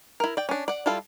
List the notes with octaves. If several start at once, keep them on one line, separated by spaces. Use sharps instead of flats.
E4 A#4
D5 G5
C#4 D4
D5 F#5
G3 E4 F4 A4 F5